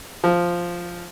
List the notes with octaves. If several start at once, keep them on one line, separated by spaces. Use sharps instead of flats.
F3